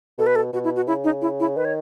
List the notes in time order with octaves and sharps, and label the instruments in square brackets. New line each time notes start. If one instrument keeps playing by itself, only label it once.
[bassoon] B2 [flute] A4
[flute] B4
A4
[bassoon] B2 [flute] F#4
[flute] E4
F#4
[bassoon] C#3 [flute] E4
[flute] D#4
E4
E4
[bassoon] D#3 [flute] B4
[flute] C#5